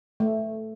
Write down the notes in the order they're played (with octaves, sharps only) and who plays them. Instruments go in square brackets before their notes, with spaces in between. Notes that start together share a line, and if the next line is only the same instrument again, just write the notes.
[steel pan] A3